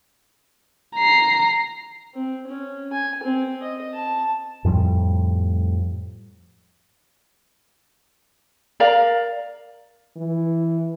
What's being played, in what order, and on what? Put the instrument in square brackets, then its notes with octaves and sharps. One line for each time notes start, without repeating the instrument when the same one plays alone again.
[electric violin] A#5 C7
[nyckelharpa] C4
C#4
G#5
C4
D#5
A5
[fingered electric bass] F2 A2 F3 G3
[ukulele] A#4 D5 F5 A#5
[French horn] E3